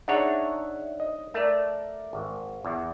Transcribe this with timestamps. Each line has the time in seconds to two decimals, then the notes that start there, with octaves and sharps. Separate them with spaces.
0.08 D4 D#4 G#4 C#5 E5 F#5
1.00 D#5
1.34 A3 A#4 D5
2.13 G#1
2.64 E2